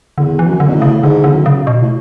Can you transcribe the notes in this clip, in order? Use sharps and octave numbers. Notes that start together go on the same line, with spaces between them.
E2 D3
E3
E2
F#2
D3
B2
A2
C#3
G#2 D3
E2 D3
F#2
C#3
B2
A2